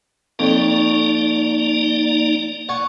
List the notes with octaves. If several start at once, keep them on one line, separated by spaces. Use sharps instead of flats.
F2 A#3 D#4 C#5 D5
D5 F#5 G#5 C#6